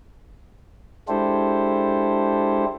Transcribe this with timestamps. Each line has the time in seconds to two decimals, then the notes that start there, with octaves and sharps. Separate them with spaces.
1.08 G#3 D4 E4 G4 A4 C5